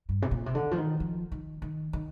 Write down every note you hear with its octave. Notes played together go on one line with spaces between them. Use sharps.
G2
C3
A#2
C3
D3
F3
D#3
F3
D#3
D#3
D#3